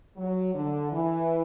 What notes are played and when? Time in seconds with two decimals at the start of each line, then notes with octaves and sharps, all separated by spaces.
0.17 F#3
0.54 D3
0.91 E3